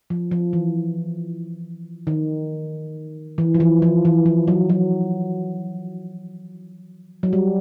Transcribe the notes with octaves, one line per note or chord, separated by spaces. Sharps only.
F3
F3
E3
D#3
E3
F3
E3
F3
E3
F3
F#3
F#3
F#3
G3